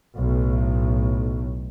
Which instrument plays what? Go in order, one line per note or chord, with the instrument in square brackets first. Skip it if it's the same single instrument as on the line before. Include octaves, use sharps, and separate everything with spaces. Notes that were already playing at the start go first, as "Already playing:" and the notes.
[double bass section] B1 A2